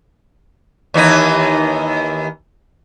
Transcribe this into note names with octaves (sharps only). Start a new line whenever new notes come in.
D#2 E3 D#4